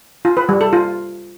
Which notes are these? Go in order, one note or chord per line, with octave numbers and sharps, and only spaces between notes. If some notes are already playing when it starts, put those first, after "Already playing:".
F4
B4
G3
A4
F4